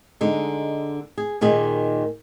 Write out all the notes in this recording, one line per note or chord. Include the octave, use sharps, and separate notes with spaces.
D3 G#3 D#4
G#4
D#2 A#2 D#3 G#4